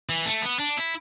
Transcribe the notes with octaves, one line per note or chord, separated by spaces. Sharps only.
E3
A3
B3
D4
E4